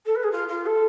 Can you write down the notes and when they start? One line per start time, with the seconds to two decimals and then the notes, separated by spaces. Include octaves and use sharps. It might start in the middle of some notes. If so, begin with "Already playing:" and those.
0.06 A4
0.15 B4
0.23 G#4
0.31 F4
0.48 F4
0.66 A4